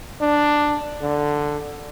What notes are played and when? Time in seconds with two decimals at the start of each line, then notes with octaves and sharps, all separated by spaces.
0.21 D4
1.01 D3